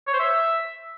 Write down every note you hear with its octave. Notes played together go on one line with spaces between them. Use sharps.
C#5
C5
E5